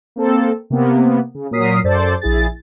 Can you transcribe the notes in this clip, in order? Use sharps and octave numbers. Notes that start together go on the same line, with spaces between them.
A#3 C4 A4
C3 A#3 B3
C#3
A#2 F#3 A#4 D#6 B6 C7
F#2 A4 C5 D5 A6
A#1 E4 G#4 A6